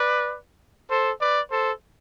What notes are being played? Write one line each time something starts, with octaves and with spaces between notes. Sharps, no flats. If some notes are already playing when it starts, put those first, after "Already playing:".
Already playing: B4 D5
A4 C5
B4 D5
A4 C5